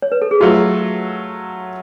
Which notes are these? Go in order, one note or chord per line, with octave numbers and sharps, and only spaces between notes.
C#5
B4
A4
G#4
F#3 A3 F4 F#4